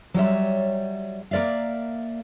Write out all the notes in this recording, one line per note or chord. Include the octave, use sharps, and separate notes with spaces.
F#3 G3 C#5 E5
A#3 A#4 D5 E5 F5